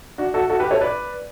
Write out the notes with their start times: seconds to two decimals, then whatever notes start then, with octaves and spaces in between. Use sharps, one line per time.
0.18 D4 F#4
0.34 F#4 A4
0.50 F#4 A4
0.60 G4 B4
0.71 A4 C#5
0.81 B4 D5